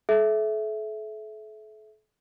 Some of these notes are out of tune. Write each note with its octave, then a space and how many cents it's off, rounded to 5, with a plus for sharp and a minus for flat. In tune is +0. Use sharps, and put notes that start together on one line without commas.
A4 -40 E5 +0